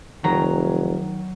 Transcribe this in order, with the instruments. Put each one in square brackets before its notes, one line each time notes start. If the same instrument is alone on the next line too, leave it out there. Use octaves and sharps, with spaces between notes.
[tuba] F1 [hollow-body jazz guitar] D#3 [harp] F#3 [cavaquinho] A#5